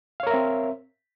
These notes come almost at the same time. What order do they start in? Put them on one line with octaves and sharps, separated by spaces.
F5 C#5 A#4 E5 C4